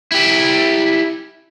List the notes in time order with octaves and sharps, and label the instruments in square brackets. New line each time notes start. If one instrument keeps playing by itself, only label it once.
[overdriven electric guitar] E4 G4